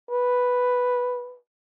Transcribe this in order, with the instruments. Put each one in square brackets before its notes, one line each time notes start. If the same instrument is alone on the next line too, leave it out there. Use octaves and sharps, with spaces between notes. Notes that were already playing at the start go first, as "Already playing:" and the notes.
[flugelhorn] B4